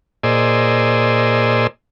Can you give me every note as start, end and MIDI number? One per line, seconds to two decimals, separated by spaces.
0.23 1.67 46
0.23 1.67 68
0.23 1.67 72
0.23 1.67 74
0.23 1.67 75
0.23 1.67 88